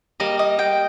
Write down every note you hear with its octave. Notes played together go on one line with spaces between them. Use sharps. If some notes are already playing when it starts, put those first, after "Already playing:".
G3 A#3 D#5
D#5
G5